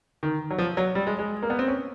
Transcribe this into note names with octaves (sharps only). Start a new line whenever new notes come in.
D#3
F#3
F3
F#3
G3
G#3
G#3
A#3
B3
C4
C#4